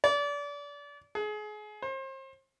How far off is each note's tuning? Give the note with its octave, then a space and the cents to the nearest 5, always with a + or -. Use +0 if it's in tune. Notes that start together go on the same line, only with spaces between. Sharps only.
D5 -30
G#4 +30
C5 +35